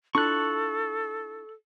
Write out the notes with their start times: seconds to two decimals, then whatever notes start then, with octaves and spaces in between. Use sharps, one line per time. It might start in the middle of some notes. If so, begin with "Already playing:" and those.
0.15 D4 E4 F4 A4 C#6 F#6